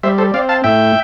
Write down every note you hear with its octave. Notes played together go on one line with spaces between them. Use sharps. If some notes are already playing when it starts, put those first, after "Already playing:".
G3 C5 E5
A4 C5
C4 D5 F5
F5 A5
A2 E5 G5